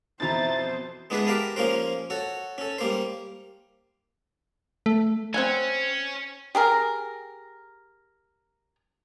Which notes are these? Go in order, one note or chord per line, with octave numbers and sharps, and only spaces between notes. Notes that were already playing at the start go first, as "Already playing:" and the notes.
F2 B2 E3 E4 C5 E5 A#5 A6
G#3 B3 D4 E4 G#4 B4
G4 A#4 B4 F5 A5
F3 A#3 C#4 A#4 C5
F#4 A4 C#5
C#4 A4
G3 A#3 C5
A3
C4 C#4 F#5 G#5
G4 G#4 A#4